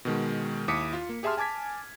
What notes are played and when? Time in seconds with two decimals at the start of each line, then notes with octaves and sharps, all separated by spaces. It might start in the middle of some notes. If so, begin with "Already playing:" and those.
0.05 B2 D#3 G#3
0.68 D#2 E4 D6 D#6 B6 C#7
0.93 F4
1.09 A#3
1.23 G4 G#4 E5 A5 C6 F6
1.37 G#5 A5 D6 G#6 B6